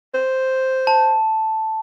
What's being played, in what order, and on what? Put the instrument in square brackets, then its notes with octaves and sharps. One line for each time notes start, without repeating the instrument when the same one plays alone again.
[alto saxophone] C5
[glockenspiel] A5